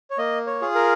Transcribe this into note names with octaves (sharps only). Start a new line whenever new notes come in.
C#5
A#3 D#5
C#5
F4 G#4
A#4